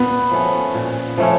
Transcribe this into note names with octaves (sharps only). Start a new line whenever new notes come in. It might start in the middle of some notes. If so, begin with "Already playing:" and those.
Already playing: A#2 B3
F3 A3 C#4
A#2
F3 A3 C#4